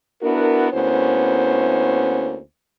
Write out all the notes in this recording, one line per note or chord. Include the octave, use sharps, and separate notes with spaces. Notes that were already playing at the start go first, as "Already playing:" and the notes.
B3 D4 E4 F#4 A#4
D2 A#3 B3 C#4 E4 C5